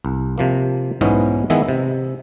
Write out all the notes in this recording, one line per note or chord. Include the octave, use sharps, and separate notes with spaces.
C2
C3 F3 A#3
B1 G#2 E3 G#3 B3 C#4
D#3 E3 G#3 B3 E4
C3